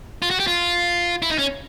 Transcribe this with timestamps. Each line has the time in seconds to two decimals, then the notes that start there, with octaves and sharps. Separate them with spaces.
0.22 F4
0.30 F#4
0.40 G4
0.47 F4
1.22 E4
1.30 D#4
1.38 C#4